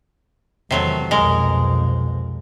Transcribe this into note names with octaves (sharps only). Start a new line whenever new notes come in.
E2 C3 D#3 F#3 A3
B1 F2 G#3 A#4